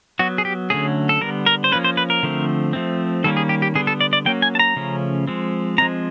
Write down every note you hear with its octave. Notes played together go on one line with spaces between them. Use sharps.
F#3 B3 F#4
G#4
G4
D3 F#3 A3 C#4 G#4
A4
D3 G3 B3 A#4
A#4
C5
F3 A#3 C#4 B4
C5
B4
A#4
D3 F3 A3 C4
F3 A3 C4
D#3 G3 A#3 C#4 A4
G#4
G4
G4
D3 G3 B3 G#4
A4
D5
D5
F#3 A#3 C#4 G5
G#5
A5
A#5
C#3 F3 A3 C#4
F3 G#3 C4
F3 G#3 C4 A#5